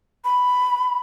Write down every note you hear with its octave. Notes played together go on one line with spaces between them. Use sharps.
B5